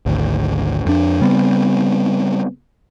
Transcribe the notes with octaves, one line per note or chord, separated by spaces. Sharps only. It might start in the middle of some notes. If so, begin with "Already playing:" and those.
G#1 D2
F2 D4
C#3 G3 B3 C4